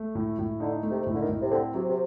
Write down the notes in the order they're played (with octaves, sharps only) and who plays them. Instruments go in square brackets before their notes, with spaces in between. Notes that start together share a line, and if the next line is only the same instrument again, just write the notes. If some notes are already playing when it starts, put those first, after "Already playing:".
Already playing: [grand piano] A3
A2
A2
[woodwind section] D3 [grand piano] D#4
[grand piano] A3
[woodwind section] C3
[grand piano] A2
[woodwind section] D3
D#3
[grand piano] A2
[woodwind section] C3
[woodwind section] D3 [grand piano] C4
[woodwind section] C3 [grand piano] F#3
[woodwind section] C3